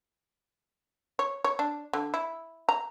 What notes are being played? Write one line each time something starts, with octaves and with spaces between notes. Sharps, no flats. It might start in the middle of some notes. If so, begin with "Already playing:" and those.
C#5
C#5
D4
D3
E4
A#5